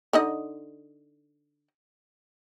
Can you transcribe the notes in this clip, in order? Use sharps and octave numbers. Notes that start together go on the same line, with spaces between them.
D3 D#4 D#5